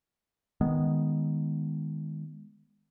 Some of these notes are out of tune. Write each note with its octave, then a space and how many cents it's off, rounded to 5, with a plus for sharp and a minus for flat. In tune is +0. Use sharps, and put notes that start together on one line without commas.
D#3 +0 G#3 -5 B3 +0